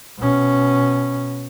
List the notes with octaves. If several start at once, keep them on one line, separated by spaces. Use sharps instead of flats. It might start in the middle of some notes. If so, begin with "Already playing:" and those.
B2 C#4